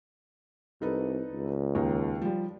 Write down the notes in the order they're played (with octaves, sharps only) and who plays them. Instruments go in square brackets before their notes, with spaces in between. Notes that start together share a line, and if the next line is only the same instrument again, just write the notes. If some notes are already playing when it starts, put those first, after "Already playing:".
[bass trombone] C2 [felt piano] D#4 A4 B4
[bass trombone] C#2
[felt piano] D#2 D#4
F3 G3